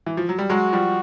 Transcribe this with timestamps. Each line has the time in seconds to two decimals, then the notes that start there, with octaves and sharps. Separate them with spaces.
0.06 E3
0.17 F3
0.29 F#3
0.39 G3
0.50 F#3 G#3 F#4
0.73 F3 G3